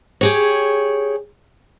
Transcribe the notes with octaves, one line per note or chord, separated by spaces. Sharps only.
G4 G#4 C#5